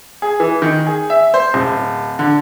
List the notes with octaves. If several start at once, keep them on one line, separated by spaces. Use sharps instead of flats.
G#4
E3
D#3
G#4
E5
C5
D1
D3